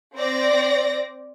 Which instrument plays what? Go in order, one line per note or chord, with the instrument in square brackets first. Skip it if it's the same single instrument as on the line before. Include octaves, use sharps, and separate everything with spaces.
[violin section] C4 D5 A#6